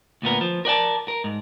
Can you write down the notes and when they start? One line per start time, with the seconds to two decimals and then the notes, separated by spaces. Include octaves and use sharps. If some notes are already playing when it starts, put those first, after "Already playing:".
0.22 D2 A#2 B3 A#4
0.41 F3
0.65 A#4 D5 F#5 A5
1.08 A#4
1.24 G#2